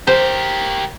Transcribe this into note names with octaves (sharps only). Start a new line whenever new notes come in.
G4 A#4 C5